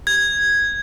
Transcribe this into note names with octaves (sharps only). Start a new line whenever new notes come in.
G#6